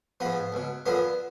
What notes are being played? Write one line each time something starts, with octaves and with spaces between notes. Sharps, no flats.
G#2 F3 B3
C#2 B2
F#2 D3 F3 B3